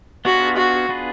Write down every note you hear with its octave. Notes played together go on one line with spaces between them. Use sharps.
B3 D4 F4 F#4 G#4 B4
F#4
B3 D4 F4 G#4 B4